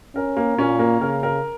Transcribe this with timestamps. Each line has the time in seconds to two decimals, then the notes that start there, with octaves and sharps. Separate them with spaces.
0.15 C#4 A#4
0.37 A#3
0.58 A#2 C#4
0.79 A#3
1.01 C#3 A#4
1.23 A#4